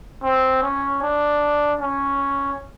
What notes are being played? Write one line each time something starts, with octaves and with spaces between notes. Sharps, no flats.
C4
C#4
D4
C#4